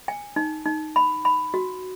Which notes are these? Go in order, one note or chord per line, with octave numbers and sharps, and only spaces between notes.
G#5
D#4
D#4
B5
B5
F#4